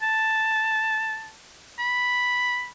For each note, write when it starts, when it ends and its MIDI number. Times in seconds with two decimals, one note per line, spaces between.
0.02 1.30 81
1.79 2.67 83